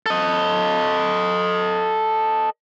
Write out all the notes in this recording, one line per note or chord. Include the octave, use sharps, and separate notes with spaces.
A4 D#5